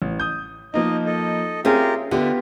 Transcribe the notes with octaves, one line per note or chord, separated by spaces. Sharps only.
A1
D#6 G6
F3 A#3 D#4 D#5
A4 D#5
C4 C#4 F4 G4 G#4 A#4 E5
D3 B3 F4 G4 E5